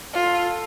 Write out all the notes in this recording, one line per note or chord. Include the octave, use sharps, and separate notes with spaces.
F4 A4